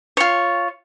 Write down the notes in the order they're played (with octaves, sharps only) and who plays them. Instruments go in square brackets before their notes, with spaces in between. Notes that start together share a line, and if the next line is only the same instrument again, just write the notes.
[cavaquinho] F4 C#5